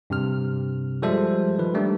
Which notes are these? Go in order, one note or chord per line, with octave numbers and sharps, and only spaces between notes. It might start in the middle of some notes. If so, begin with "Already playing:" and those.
G2 C3 F6
F3 G3 G#3 A4 C5 E5
D#3 F3 B4
D#3 G3 A3 D4